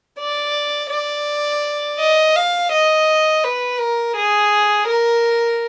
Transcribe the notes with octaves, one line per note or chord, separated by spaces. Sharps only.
D5
D5
D#5
F5
D#5
B4
A#4
G#4
A#4